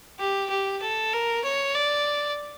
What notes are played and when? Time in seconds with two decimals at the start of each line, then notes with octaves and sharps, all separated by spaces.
0.20 G4
0.50 G4
0.82 A4
1.13 A#4
1.44 C#5
1.75 D5